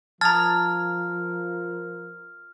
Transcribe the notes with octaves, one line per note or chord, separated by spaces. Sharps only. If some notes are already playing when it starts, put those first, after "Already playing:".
F3 F4 A#4 A5 A#5 D#6 F6 G#6